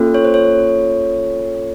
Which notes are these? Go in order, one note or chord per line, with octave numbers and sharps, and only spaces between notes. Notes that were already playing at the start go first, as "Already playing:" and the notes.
Already playing: A#3 C#4 F4 A4
C#5
C5
C#5